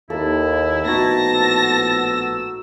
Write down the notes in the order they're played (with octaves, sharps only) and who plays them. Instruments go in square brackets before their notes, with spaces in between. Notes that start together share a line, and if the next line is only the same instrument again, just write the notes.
[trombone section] D#2 [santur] A#3 A4 [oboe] E4
[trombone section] A#1 A2 B3 [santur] D#4 F#4 [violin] A5 A#6
[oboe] E6